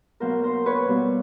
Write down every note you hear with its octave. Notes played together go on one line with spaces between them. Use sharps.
B2 F#3 A#3 A#4 C5
A#4 C5
B4 C#5
B2 G3 A#3